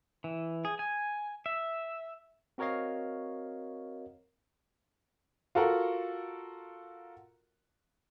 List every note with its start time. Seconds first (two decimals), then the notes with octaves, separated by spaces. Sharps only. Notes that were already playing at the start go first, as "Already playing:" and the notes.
0.24 E3
0.65 G#4
0.79 G#5
1.46 E5
2.58 C4 F#4 A#4 C#5 D#5 F5
5.55 F4 F#4 A4 A#4 F#5